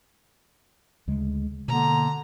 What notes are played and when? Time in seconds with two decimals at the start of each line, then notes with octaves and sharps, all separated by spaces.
1.07 D2 C#3 G#3
1.68 B2 D3 A#3 A#5